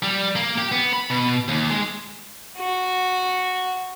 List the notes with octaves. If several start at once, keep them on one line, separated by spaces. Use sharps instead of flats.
G3
A#3
G4
B3
B5
B2
D#2
G#3
F#4